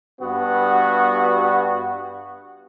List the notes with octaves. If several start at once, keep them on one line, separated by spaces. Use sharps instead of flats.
G2 B3 F#4